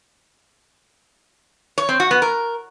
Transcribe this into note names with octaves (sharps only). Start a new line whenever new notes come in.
C#5
C4
F#4
B3
A#4